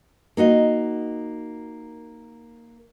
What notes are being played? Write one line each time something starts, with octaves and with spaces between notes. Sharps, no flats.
A#3 D#4 F#4 D#5